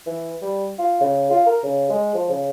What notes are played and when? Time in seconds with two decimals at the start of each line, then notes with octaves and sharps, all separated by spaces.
0.07 E3
0.42 G3
0.79 F4
1.01 C#3
1.31 F4
1.47 A#4
1.63 C#3
1.90 G#3
2.15 F3
2.30 C#3